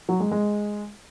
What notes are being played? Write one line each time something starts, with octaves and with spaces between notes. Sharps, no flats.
F#3
G#3
G#3